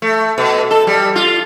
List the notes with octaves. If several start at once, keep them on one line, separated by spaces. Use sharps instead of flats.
A3
B2
A4
G3
F4